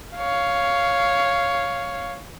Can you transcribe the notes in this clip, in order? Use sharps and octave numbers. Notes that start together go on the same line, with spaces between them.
C#5 F5